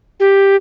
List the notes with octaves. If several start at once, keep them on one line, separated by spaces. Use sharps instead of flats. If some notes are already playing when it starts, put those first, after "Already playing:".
G4